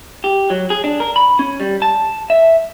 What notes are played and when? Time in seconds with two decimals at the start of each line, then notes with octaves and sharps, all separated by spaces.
0.24 G4
0.50 F#3
0.70 G#4
0.84 D4
1.00 A#4
1.16 B5
1.39 C#4
1.60 G3
1.82 A5
2.30 E5